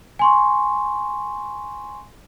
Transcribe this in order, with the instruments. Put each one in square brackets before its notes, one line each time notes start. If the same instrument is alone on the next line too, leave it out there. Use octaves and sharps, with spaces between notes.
[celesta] G#5 C6 C#6